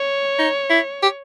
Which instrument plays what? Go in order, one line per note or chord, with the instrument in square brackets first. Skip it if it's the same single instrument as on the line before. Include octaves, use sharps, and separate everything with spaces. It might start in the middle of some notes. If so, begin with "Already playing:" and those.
Already playing: [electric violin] C#5
[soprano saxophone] D#4
E4
G4